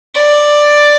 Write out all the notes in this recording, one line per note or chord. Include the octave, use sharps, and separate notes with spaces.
D5